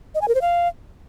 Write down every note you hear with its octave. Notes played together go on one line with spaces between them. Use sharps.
D#5
G#5
A#4
C5
F5